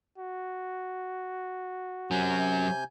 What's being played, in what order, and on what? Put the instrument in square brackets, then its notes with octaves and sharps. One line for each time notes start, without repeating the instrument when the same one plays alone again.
[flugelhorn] F#4
[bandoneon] C3 G#5 G6 [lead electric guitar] F#3 C#4